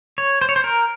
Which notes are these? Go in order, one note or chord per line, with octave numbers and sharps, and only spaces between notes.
C#5
C5
C#5
C5
A#4